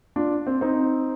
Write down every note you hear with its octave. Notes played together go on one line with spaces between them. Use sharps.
D4 F4
C4
C4 D#4